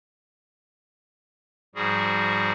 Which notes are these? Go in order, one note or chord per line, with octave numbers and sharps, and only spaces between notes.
G#2 F3 G3 F#4 G#4